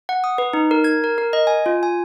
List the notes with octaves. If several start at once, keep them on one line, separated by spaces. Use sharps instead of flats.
F#5
D#6
B4
D#4
A#4
G#6
A#4
A#4
D#5
G#5
F4
G#5